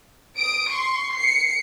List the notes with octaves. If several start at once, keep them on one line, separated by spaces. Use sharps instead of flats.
D#6 D7
C6 C#6
C7 C#7